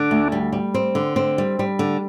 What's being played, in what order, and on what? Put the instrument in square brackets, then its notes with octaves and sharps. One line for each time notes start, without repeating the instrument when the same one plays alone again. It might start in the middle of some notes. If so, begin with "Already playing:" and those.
Already playing: [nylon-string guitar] D3 [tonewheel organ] D4
[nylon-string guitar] D2
G3
G3
C4
D3
C4
G3
G3
D3